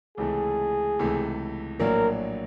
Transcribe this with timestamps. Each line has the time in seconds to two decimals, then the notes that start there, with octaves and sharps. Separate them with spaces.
0.18 C#2 C3 E3 A3 G#4
0.99 C#2 C3 E3 A3
1.80 A#1 A2 F#3 A#3 D4 A#4